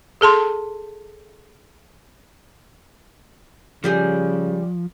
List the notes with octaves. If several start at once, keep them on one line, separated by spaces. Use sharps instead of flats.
G#4 A4 A5 C6
C#3 F3 G3 G4 G#4